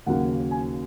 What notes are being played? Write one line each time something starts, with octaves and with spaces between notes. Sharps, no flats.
D#2 C#3 F#3 A#3 F#5
G#5